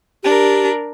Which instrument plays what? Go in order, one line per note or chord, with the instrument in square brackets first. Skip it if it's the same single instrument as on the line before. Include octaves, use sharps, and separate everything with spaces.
[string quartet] D4 A#4 [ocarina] G4